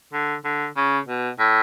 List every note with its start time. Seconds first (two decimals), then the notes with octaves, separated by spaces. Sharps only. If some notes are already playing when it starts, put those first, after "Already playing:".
0.13 D3
0.44 D3
0.77 C#3
1.07 B2
1.39 A2